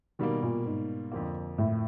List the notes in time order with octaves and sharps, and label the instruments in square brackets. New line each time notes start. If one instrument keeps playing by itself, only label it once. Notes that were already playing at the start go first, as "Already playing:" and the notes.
[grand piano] B2 G3 A#3 [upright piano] D#3
[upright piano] A#2
G#2
[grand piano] F2 D3 F3 A#3
[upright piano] A2